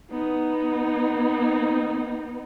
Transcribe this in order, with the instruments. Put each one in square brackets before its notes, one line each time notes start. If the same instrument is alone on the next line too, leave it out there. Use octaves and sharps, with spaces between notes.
[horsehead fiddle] B3 D#4